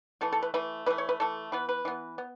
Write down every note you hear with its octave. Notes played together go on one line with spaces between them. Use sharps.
E3 A3 A4
A4
B4
E3 A3 B4
E3 A3 B4
C#5
B4
E3 A3 A4
E3 B3 B4
B4
E3 B3
B3